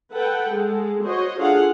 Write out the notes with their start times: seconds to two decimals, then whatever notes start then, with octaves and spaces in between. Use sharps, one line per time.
0.12 A4 B4 F#5 G5
0.51 G#3 A4
1.02 F#4 C5 C#5 D#5
1.38 D4 F4 G#4 A4 F5 F#5